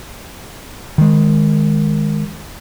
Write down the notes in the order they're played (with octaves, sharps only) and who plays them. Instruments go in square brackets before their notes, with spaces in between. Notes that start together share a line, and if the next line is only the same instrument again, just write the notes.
[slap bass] D#3 G#3